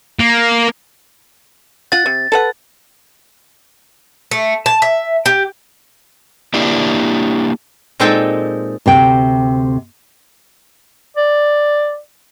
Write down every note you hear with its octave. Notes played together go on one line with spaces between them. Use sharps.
A#3
F4 F#5 A6
C3
A4 B4 F#5
A3
A5
E5
G4
A#3 D4 E4 G4
A#2 G#3 C4 D#4 A4 G5
D2 C3 G5
D5